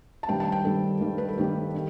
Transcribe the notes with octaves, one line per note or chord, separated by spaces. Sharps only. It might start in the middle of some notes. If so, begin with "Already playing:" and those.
A5
G2 D#3 G3 G5
A5
G5
G2 D#3 G3 A4
G2 D#3 G3
B4
A4
G2 D#3 G3 G4
D#3